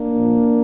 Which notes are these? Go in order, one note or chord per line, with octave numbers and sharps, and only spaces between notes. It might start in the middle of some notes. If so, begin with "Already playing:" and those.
Already playing: A#3 D4
A#2 F3